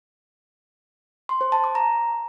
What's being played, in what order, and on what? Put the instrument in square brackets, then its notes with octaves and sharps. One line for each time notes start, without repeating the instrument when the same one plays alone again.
[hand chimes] C6
C5
A5
D6
A#5